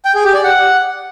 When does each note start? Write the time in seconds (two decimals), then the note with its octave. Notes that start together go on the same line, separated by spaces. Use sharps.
0.05 G5
0.15 G#4
0.24 G4
0.34 D5
0.44 F#5